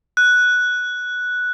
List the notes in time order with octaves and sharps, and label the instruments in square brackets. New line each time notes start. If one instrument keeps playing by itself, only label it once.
[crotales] F#6